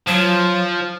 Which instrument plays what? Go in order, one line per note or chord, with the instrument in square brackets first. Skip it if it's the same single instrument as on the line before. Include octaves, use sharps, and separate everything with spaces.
[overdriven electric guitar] F3 [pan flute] F#3